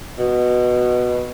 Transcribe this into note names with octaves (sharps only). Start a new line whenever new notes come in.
B2